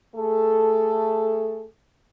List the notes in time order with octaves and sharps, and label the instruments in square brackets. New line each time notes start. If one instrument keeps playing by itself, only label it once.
[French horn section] A3 G#4 A4